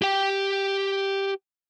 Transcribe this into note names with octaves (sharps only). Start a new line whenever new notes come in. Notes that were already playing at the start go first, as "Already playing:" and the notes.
G4 G5